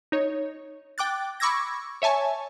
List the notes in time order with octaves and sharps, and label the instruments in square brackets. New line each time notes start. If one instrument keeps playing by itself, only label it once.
[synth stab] D#4 C#5
G5 D6 F#6 A6
B5 C#6 D6 E6 G#6 A#6
C#5 E5 G#5 A5 C#6